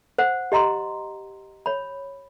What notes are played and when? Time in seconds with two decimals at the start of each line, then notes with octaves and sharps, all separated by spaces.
0.18 C5 F#5
0.52 G4 D#5 A#5 C6
1.66 C#5 B5